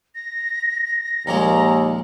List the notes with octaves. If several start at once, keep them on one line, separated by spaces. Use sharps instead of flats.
A#6
D#2 A#2 F3 G#3 A#5